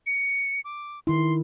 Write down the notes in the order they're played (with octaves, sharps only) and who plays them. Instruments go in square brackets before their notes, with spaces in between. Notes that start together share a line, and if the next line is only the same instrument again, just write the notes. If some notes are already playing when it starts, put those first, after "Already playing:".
[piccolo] C#7
D6
[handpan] D#3 E4 [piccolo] C6